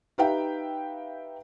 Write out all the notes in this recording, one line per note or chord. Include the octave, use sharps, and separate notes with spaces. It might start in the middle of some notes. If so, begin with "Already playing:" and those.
D#4 G4 B4 E5 F5 G5